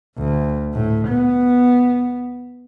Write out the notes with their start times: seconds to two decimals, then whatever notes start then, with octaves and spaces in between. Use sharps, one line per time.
0.17 D2
0.74 A2
1.08 B3